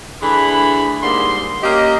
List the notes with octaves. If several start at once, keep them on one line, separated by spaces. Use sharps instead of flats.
D3 E3 A3 G#4 B5
G#2 D3 G3 A#3 G#4 C6
A#3 C#4 G4 D#5